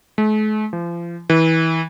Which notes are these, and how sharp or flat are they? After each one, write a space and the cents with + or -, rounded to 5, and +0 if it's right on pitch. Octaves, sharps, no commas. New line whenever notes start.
A3 -45
F3 -35
E3 -25